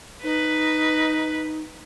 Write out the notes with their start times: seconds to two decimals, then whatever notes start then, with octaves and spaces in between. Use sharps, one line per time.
0.23 D#4 B4